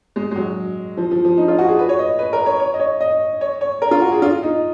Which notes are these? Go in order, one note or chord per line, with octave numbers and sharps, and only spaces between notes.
G#3
G#3
F#3
F3
F3
F3
D#4
F4
F#4
G#4
B4
C#5
D#5
B4
A#4
C#5
C#5
D#5
C#5
D#5
C#5
C#5
A#4
F4
F#4
G#4
F4
D#4